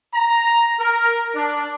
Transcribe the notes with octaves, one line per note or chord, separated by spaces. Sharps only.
A#5
A#4
D4